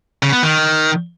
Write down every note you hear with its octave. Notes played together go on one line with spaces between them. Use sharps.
C#3
B3
D#3